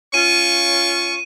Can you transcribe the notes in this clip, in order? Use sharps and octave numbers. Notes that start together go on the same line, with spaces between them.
C#4 F4 C#6 D#7